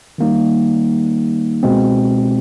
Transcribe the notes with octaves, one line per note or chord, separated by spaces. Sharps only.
D#3 G3 A#3 D#4
B2 G#3 C4